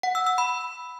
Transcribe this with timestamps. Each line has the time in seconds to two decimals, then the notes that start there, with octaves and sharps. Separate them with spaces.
0.03 F#5
0.15 E6
0.27 E6
0.38 B5